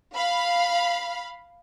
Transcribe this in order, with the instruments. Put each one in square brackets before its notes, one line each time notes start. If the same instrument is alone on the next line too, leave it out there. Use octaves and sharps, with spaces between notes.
[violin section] F5 B5